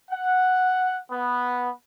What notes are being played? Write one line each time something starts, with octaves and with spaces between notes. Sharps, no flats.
F#5
B3